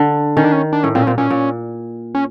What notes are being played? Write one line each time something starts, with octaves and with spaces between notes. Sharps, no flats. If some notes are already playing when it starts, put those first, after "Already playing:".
Already playing: D3
D#3 C#4
D4
C#4
D4
A2 C#4
A#2 C4
C#4
A#2 C4
A#2 C#4
A#2
C#4